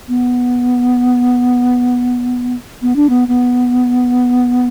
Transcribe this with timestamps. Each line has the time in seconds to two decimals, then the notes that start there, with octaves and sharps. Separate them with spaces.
0.08 B3
2.82 B3
2.96 D4
3.09 B3
3.28 B3